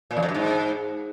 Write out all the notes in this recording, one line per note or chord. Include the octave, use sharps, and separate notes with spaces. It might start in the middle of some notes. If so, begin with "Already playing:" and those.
A#2
E2
F2
F#2
G#2